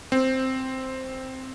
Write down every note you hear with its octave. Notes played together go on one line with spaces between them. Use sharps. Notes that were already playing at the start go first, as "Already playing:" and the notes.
C4